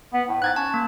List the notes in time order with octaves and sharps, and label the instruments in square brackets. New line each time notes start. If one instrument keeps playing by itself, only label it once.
[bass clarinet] B3
A2
[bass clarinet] G#2 [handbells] F#6 G#6 A6
[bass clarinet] C#4 [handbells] A5
[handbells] A#3